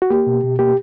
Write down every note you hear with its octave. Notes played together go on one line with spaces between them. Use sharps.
F#4
A#3 G4
B2
B2
A#3 G4